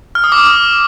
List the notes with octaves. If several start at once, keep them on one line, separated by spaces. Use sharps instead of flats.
F6
D#6
D6